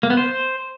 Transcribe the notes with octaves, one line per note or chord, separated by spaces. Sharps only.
A#3
B3
C5